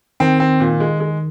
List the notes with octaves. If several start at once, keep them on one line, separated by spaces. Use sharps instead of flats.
D#3 C4
C4
A#2
G#3
G#3